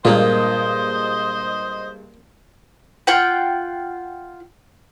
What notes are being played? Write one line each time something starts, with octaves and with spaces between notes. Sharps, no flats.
G2 A#2 G#3 A#3 F4 C5 D#5
F4 F#5 G5